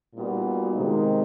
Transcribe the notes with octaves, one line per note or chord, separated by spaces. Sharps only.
A#2 G3 B3 D#4 F#4
C3 D#3 G#3 C4 D#4